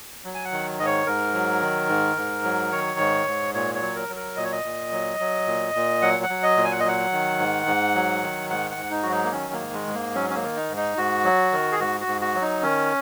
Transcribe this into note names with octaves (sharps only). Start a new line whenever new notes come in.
F#3
G#5
F#5
D#3
G#2 D#5
C#5
G#2 A#4
F#3
D#3
G#2
G#2
F#3
D#3 C#5
G#2
G#2
A#2 C#5
C#5
F#3
A#4
F#3
A#4
A#2 D#5
C#5
D#5
A#2
F#3
F#3
A#2
A#2
F#3 F#5
F#5
F#3
D#5
A#2
G#5
F#5
D#5
F#3 F#5
D#3
G#2
G#2
F#3
D#3
G#2 F#5
F#5
G#2
D#4
F#3 F#4
D#4
A#3
D#3 C#4
A#3
G#2
G#3
G#2
A#3
F#3 C#4
C#4
A#3
D#3
D#4
G#2
D#4
G#2 F#4
F#3
D#3
G#4
G#2 F#4
F#4
G#2
F#4
F#3
D#4
D#3 C#4